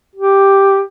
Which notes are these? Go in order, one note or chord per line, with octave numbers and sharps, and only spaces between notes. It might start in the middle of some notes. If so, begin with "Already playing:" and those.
G4